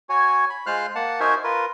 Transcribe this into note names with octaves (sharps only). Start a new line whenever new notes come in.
F#4 C#5 G#5
B5
G#3 F4 C5 F5 F6 F#6
A#3 F#5 A5
D#4 F#4 A#4 C5 E5 G#5
F4 A#4 B4